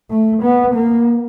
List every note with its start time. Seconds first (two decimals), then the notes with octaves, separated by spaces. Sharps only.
0.10 A3
0.42 B3
0.75 A#3